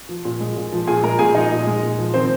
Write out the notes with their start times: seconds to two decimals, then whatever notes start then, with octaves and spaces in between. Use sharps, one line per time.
0.09 F3
0.25 A#2
0.40 G#3
0.56 A#2
0.72 F3
0.87 A#2 G#4 G#5
1.03 G#3 A#4 A#5
1.19 A#2 G#4 G#5
1.35 F3 D#4 D#5
1.51 A#2
1.67 G#3
1.83 A#2
1.98 F3
2.14 D#3 C4 C5